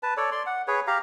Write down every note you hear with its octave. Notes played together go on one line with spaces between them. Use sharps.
B4 A5
A4 C#5 D5
D5 C6
F#5
G#4 B4 C#5
G4 F5 A#5